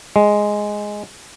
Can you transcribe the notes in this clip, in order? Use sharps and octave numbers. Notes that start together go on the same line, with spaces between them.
G#3